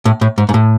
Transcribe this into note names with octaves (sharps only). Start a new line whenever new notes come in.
A2
A2
G#2
G#2
A2